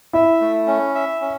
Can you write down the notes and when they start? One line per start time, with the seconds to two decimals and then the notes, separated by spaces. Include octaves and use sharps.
0.13 E4 E5
0.41 A3
0.67 C#4
0.95 E5
1.21 C#4